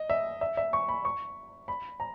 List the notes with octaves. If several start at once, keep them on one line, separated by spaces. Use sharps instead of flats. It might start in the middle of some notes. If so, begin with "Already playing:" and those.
Already playing: D#5
E5
E5
E5
C#6
B5
C#6
B5
A#5